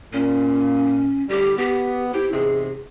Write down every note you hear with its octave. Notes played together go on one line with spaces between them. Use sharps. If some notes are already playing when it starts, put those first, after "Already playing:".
A#2 C#4
A2 D3 G3 G4
B3 G4
C4 E4 G4
E2 G#2 C3 G#4